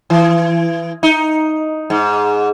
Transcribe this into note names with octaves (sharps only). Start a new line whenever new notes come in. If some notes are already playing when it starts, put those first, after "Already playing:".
E3
D#4
G#2